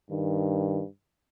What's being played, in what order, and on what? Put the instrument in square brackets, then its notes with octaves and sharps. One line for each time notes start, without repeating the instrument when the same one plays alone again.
[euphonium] G2 [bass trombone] D#3